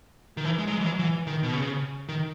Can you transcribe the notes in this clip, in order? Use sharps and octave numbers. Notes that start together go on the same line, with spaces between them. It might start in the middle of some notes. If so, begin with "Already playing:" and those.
D#3
E3
G#3
F#3
G#3
E3
F#3
E3
D#3
B2
C#3
D#3